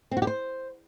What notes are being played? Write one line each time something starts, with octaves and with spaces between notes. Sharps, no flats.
C4
F#4
G4
C5